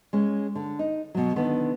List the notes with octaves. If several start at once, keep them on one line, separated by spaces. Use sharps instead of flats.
G#3 C#4
D3
D#4
B2 F#3
D3 D#3 B3